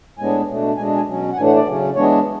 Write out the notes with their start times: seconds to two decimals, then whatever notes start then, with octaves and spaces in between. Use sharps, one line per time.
0.18 A2 G#3 B3 D4 G#5
0.48 B2 A3 D4
0.77 B2 G#3 D4 G#5
0.97 G#5
1.06 B2 F#3 C#4
1.32 F#5
1.36 A2 E3 A3 D4 G#5
1.46 F#5
1.56 D5
1.66 C#3 F#3 C#4
1.96 E3 G#3 B3 D4 C#5